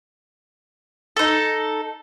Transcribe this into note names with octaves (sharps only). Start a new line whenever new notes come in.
D#4 A4